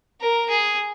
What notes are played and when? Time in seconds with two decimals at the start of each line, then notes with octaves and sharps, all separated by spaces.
0.21 A#4
0.50 G#4